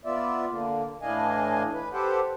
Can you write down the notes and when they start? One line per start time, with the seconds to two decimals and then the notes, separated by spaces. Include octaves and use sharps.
0.05 B3 F4 D5 E5
0.50 D3 A#3
1.02 A2 E3 D4 D#5 F5 G#5
1.73 B4
1.93 G4 A4 B4 C5 F#5 G5